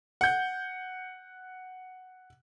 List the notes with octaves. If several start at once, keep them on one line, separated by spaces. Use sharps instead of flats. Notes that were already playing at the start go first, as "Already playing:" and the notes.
F#5 G6